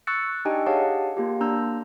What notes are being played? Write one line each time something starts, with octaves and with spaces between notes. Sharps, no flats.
C#6 E6 F#6 A6 C#7
D4 D#4 G4 D#5 G5 G#5
G4 G#4 C#5 F5 F#5 A5
A#3 F4 G4
A#3 D4 A#5 E6 G6